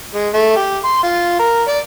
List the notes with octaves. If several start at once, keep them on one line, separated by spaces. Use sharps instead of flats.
G#3
A3
G4
C6
F4
A#4
D5